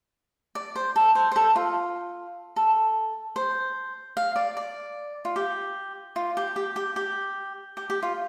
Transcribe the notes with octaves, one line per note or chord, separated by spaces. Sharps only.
D5
C5
A4
C5
C5
A4
F4
A4
C5
F5
D5
D5
F4
G4
F4
G4
G4
G4
G4
G4
G4
F4